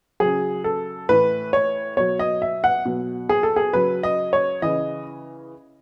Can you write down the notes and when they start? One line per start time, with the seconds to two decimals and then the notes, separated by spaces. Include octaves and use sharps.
0.20 C#3 F#3 G#4
0.64 A4
1.09 A2 E3 B4
1.53 C#5
1.97 B2 F#3 C#5
2.19 D#5
2.42 E5
2.64 F#5
2.86 B2 F#3
3.29 G#4
3.43 A4
3.56 G#4
3.73 C#3 F#3 B4
4.03 D#5
4.33 C#5
4.62 C#3 E3 D#5